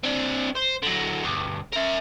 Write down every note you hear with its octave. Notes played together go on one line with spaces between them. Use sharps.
C4 D4
C5
D3 F#3
D2 G2
A#4 E5